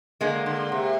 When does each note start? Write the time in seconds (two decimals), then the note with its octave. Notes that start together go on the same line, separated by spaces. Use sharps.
0.21 D3 G#3 A#3
0.46 D3
0.72 C3